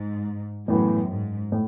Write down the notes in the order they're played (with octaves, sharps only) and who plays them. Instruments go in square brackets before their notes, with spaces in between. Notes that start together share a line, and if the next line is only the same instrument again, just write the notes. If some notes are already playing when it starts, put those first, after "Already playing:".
Already playing: [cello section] G#2
[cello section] F#2 [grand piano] A2 E3 B3
[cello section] G#2
[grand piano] A2